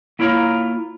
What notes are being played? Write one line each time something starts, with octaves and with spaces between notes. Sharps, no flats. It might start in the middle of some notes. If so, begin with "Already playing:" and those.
A#3 E4 F4 C#5 A#5